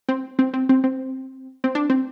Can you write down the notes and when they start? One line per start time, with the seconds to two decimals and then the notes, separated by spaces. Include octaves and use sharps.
0.09 C4
0.39 C4
0.54 C4
0.69 C4
0.84 C4
1.64 C4
1.75 D4
1.90 C4